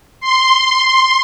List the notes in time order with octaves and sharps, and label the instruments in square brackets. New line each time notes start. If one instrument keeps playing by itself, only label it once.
[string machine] C6